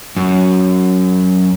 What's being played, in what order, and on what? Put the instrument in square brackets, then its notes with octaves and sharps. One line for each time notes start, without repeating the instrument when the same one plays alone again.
[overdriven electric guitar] F#2